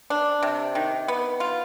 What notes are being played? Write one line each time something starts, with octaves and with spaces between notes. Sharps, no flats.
D4
C3
D#3
B3
F4